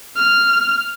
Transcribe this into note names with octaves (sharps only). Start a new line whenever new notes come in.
F6